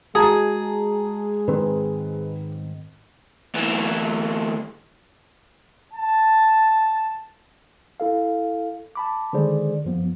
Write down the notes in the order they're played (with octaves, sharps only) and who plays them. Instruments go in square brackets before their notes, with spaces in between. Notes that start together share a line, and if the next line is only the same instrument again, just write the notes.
[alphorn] G#3 [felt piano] F#4 A5 A#5 [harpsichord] G#4
[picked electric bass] G#2 D#3 C4 [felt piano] B4
[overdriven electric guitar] D2 E3
[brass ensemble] A5
[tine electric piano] E4 A4 F5
A5 B5 D6
D3 D#3 G#3 G#4 C5 D5
F#2 F3 B3